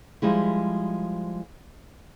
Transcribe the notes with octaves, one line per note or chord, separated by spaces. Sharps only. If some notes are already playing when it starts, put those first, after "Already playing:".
F3 G3 G#3 E4